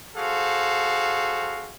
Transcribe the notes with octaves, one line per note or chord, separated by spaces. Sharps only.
F#4 G#4 A4 C5 F5